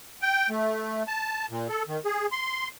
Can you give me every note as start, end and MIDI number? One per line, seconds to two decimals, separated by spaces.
0.22 0.49 79
0.50 1.03 57
1.07 1.46 81
1.50 1.68 46
1.69 1.83 69
1.88 2.00 51
2.05 2.26 68
2.31 2.68 84